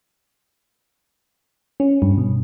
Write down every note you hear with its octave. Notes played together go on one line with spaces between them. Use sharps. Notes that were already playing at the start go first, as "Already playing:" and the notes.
C#4
G2
B2